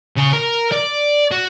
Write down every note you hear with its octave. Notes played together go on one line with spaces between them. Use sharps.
C#3 G#5
A#4
D5
F#4